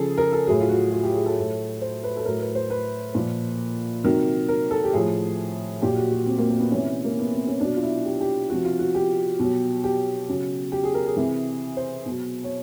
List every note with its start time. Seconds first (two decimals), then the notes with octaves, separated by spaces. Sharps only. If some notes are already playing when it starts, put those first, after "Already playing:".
Already playing: C#3 F3 G#4 A4
0.18 A#4
0.32 A4
0.47 A2 F#3 G#4
0.60 F4
0.69 F#4
0.92 F4
1.03 G4
1.14 G#4
1.26 A4
1.37 A2 F#3
1.81 C5
2.03 B4
2.17 A4
2.25 A2 F#3 A#4
2.40 B4
2.55 C5
2.70 B4
3.15 A#2 F3
4.04 C3 D#3 F#3
4.49 A#4
4.71 A4
4.84 G4
4.93 A2 F3 G#4
5.82 A#2 F#3 G4
5.97 F#4
6.11 F#4
6.26 C4
6.38 A#3
6.49 A#3
6.60 B3
6.71 C3 E3 C#4
7.04 A#3
7.19 B3
7.32 C4
7.47 C#4
7.60 B2 F#3 D4
7.76 F4
7.83 E4
8.05 G4
8.21 G4
8.50 C3 F3 F#4
8.65 F4
8.79 F#4
8.95 G4
9.39 B2 F#3
9.84 G4
10.28 C#3 F#3
10.72 G4
10.83 G#4
10.94 A#4
11.06 G#4
11.17 C3 E3
11.77 C5
12.06 B2 F#3
12.44 C#5